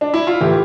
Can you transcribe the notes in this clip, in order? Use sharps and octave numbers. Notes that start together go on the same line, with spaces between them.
D4
E4
F4
A2 E3 G4